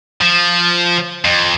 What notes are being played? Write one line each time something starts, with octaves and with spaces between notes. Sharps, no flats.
F3
F2